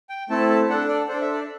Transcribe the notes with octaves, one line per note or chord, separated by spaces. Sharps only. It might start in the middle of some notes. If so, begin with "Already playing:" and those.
G5
A3 C4 E4 A4 A5
A5
D4 A4 F#5
D5
D4 A4 C5
E5
D5